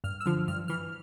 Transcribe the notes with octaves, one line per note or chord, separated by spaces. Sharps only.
G2 F6
E6
D3 F3 F6
G2 F6
E3 F6